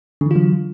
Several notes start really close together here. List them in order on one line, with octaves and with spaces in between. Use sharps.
D3 E3 F4 F#3